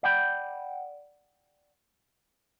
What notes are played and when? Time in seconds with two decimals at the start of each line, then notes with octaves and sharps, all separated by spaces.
0.03 D5 F#5 G5 B5